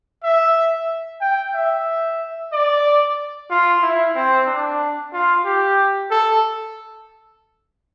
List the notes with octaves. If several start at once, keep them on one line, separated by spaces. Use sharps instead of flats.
E5
G5
E5
D5
F4
E4
C4
D4
F4
G4
A4